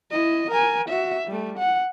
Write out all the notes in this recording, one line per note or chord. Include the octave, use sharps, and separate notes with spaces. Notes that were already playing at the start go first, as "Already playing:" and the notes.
E4 D#5
A#4 G#5
F#4 E5
G3 A3
F#5